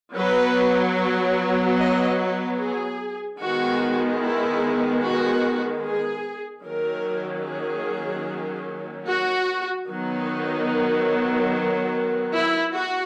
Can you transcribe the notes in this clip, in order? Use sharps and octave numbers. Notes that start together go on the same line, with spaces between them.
F#3 B3 B4
D#5
B4
G#4
D#3 G#3 B3 F#4
E4
F#4
G#4
D#3 F#3 A#3 C#4 A#4
G#4
F#4
D#3 F#3 B3 D#4
E4
F#4